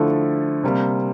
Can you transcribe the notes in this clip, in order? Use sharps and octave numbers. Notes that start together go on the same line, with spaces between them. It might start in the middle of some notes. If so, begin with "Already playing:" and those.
Already playing: D3 F3 A3 E4
C3 G3 A#3